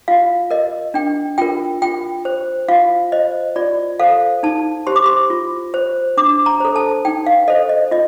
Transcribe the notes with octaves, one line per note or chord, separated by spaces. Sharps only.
F4 F5
A#4 D#5
D4 G5
F4 A#4 G5
F4 G5
C5
F4 F5
C5 D#5
F4 D5
A4 C5 F5
D#4 A5
G4 C5 C6
D6
C6
F4
C5
D4 D6
A#5
A4 C5
A5
D#4 G5
F5
A4 C5 D#5
D#5
F4 D#5